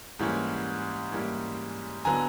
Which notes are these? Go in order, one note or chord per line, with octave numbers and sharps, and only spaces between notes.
G#2 E3 G3 A#3 C#4
G#2 E3 G3 A#3 C#4
D3 F#3 B3 G#5 A#5